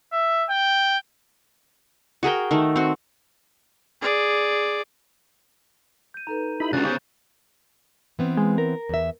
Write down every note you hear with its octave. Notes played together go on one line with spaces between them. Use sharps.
E5
G5
F#4 G#4 A#4 G5
D#3 A3
C4 F#4
G#4 D5
G6 D#7
D#4 A4 B4 A#5
D#4 E4 G4 B5
C#2 C#3 C#4 D4 F4 F#4 F#6 A6
C#3 B3 G4 G#4 C5 C#6 G6 E7
E3 B3 C4
G#3
A#4
E2 E5